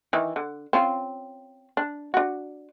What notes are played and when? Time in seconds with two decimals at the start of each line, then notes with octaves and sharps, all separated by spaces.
0.13 D#3 E3
0.36 D3
0.73 C4 C#4 F4
1.77 D4
2.14 D4 F#4